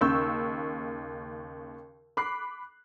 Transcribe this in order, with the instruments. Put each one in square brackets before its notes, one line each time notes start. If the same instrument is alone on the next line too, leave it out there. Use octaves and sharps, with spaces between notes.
[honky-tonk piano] D#2 C#3 C#6 E6 G6
B5 D6 F#6 C7